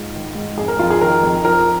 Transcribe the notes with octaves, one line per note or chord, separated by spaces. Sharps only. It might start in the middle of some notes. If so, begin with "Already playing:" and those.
Already playing: G#2 F4
D#3
G#2
F2 G#4
A#4
F2 F4
G#4
D#3 A#4
F2
F3 A#4